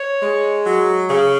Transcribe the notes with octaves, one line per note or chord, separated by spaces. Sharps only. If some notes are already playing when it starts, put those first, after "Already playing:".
Already playing: C#5
G#3
F#3
C#3